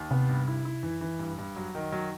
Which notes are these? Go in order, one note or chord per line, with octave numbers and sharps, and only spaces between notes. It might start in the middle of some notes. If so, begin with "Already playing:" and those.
Already playing: D#2
C3 B3
G2
E4
E4
F#2 E3
E3
G2
G2
F#3
D#3
F#3